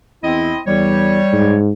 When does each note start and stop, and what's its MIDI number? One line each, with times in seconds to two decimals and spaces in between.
0.23 0.51 40
0.23 0.59 60
0.23 0.59 64
0.23 0.59 75
0.67 1.19 40
0.67 1.57 55
0.67 1.57 73
1.33 1.70 44